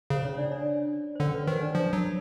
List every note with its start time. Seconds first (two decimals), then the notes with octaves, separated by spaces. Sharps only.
0.10 C#3 C5
0.24 C#4 C#5
0.38 D4 D5
0.51 D4 D5
1.15 C5
1.20 D3 C#4 C#5
1.34 B4
1.47 D#3 C5
1.61 D4 D5
1.75 F3
1.93 F#3